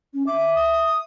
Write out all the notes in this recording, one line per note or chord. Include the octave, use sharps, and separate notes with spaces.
C#4
E5 D6
D#6